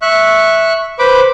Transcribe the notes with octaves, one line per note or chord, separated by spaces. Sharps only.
E5 C#6 F#6
B4 C5 B5 D6